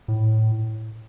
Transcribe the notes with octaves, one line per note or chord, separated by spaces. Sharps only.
A2